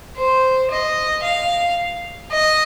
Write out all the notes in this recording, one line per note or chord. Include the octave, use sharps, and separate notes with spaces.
C5
D#5
F5
D#5